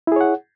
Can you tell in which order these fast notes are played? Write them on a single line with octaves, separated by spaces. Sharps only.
E4 G#4 C#5 F#5